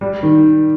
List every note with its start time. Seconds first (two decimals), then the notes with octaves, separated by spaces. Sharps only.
0.01 G3
0.23 D#3